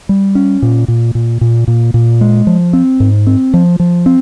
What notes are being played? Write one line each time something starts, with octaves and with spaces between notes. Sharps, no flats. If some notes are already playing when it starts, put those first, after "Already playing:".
G3
C#4
A#2
A#2
A#2
A#2
A#2
A#2
G#3
F3
C4
G#2
C4
F3
F3
C4